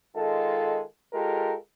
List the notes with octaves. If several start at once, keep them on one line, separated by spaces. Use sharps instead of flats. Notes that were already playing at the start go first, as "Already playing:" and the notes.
D#3 G#3 F4 A4
G#3 F4 G4 A4 A#4